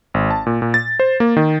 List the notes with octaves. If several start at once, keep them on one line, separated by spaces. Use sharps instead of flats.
G#1
A5
A#2
A#2
A6
C5
A#3
D#3